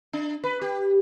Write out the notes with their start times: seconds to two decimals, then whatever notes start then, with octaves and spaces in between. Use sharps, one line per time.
0.13 D4
0.44 B4
0.61 G4